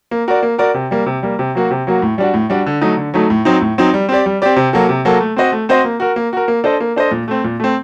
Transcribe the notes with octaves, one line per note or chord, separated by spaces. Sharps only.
A#3
F#4 A#4 D5
A#3
F#4 A#4 D5
C3
G3 A#3
C3
G3 A#3
C3
F#3 A#3 F#4
C3
F#3 A#3 F#4
A2
G3 D4 F#4
A2
G3 D4 F#4
D3
F#3 A3 D#4
D3
F#3 A3 D#4
A2
F#3 C4 D#4
A2
F#3 C4 D#4
G3
C4 G4 D5
G3
C4 G4 D5
C3
F#3 A#3 F#4 A4
C3
F#3 A#3 F#4 A4
A3
C4 F#4 C5 D#5
A3
C4 F#4 C5 D#5
A#3
F#4 A#4
A#3
F#4 A#4
A#3
D4 A4 C5 D#5
A#3
D4 A4 C5 D#5
A#2
A3 C4
A#2
A3 C4